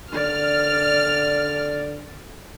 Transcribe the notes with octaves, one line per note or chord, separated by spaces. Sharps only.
D3 D5 F6